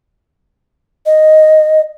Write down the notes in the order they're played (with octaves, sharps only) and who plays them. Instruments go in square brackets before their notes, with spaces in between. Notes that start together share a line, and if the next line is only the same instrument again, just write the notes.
[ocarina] D#5